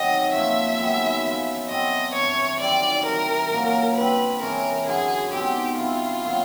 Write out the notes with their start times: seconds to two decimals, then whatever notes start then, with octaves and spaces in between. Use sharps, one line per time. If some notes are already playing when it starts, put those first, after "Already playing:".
Already playing: C3 D#3 F#3 D#5
0.33 A#2 F3 A3 E5
0.78 F#2 D#3 G#3 B3
1.24 F3 G#3 C#4
1.69 B2 F#3 A3 C4 D#5
2.14 G2 E3 A3 C#5
2.60 F#2 D#3 G3 C4 D5
3.05 C3 E3 G3 A#4
3.51 A#2 F#3 A#3 C#4
3.96 D3 G3 C4 B4
4.41 C3 E3 G#3 C#4 A#4
4.87 F#2 D3 F#3 G#4
5.33 B2 G#3 C4 D#4 G4
5.78 D3 G3 C4 E4 F4
6.23 D#3 F#3 A#3